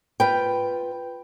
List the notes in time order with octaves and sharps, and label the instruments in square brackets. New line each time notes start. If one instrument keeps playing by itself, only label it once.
[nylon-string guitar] F4 B4 G5